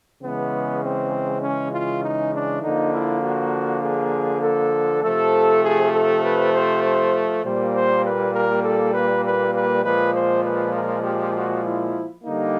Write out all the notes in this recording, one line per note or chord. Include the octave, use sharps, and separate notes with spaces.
C#3 E3 G#3 B3
C4
C#4
F4
D#4
D4
D3 F3 A#3 D#4
E4
F#4
G#4
A4
C3 F3 A3 A4
G#4
A4
B4
C5
C5
A#2 G3 A#3 C5
C5
B4
A#4
A4
B4
B4
B4
A#2 F3 G#3 B4
C5
B4
A#4
G4
F#4
E4
D3 G3 A#3 D#4